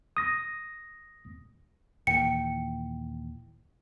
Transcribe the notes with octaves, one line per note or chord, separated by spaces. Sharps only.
D#6 A#6
D#2 A#2 E3 G5 C#7